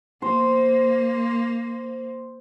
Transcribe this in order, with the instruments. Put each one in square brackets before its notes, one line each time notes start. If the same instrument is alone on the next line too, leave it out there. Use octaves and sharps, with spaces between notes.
[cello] A#3 [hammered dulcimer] C5